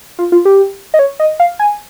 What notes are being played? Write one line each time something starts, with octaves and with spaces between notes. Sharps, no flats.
F4
F4
G4
D#5
C#5
D#5
F5
G#5